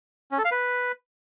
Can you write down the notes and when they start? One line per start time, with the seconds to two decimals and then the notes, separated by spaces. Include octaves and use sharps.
0.31 C#4
0.38 A4
0.45 F5
0.52 B4